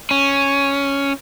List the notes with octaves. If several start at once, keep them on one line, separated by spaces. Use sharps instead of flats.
C#4